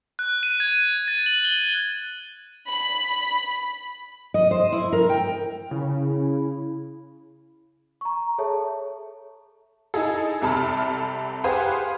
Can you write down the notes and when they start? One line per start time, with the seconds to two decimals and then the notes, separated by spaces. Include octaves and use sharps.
0.19 F#6
0.43 D#7
0.60 G#6
1.08 A6
1.26 F#7
1.45 G7
2.68 B5
4.34 D#5
4.51 C5
4.72 E4
4.92 A#4
5.09 G5
5.71 C#3 E4
8.01 A#5 C#6
8.38 G#4 A4 C#5 E5 A5
9.94 D#4 E4 G#4 A4
10.42 C2 C3 A4 A5 B5 F6
11.44 G4 G#4 B4 C5 F5 F#5